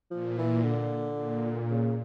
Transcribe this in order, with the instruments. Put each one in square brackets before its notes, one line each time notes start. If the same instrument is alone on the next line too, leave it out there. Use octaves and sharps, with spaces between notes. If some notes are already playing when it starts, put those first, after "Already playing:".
[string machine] A#2 [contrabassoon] F3
[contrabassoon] E3
D3
[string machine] A#2
[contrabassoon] C#3